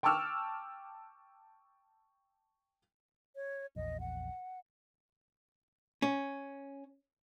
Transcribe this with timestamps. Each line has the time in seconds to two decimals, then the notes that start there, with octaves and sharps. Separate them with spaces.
0.03 G5 A5 C#6 D6 E6 F6
3.36 C#5
3.76 A#1 E2 D#5
4.00 F#5
6.02 C#4